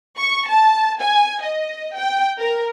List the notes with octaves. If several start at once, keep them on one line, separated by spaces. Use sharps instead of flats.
C#6
A5
G#5
D#5
G5
A#4